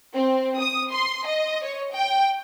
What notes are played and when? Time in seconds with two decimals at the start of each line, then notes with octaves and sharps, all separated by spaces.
0.14 C4
0.59 D#6
0.92 C6
1.26 D#5
1.64 C#5
1.93 G5